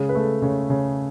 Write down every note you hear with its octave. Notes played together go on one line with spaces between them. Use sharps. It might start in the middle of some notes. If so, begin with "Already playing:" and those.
Already playing: C#3 G#3 G#4
B4
A3 A4
C#3 C#5
C#3